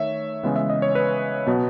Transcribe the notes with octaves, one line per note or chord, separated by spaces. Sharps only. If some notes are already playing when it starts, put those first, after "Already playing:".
Already playing: D#3 A3 C#5 E5
C#3 E3 G#3 B3
E5
D#5
C#5
B4
B2 F#3 B3